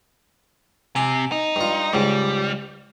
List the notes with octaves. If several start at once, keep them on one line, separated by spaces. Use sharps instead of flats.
C3 G#5
D#4
G2 F4
C#2 G#2 G3